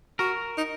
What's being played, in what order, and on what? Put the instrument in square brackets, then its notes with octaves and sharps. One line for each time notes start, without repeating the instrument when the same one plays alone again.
[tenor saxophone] F#4 [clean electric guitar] A#4
[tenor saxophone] D#4